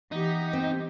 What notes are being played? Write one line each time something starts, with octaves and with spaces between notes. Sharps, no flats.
E3 B3 D#4 G4
C4